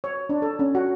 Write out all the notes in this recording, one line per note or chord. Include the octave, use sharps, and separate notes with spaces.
C#5
D4
A4
C#4
F#4